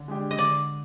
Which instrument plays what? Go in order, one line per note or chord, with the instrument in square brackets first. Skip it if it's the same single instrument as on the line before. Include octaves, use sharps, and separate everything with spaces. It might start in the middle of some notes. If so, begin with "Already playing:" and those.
Already playing: [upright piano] D3
G#3 D4 G4
[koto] D#5
[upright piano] D3 [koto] D5